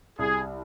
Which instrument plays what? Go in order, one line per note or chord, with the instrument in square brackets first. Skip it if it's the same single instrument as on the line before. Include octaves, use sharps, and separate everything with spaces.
[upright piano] C2 [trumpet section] G#4